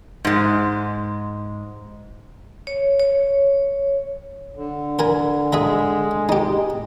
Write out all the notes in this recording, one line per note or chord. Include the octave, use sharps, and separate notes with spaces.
G#2 G#3
C#5
C#5
D3
A#4 G#5 A#5
G#3 G#4 E5 A#5
D#4 G4